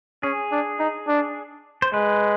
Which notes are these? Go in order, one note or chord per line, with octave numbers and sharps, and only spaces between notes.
C#4 G#4
D4
D#4
D4
C5
G#3 B4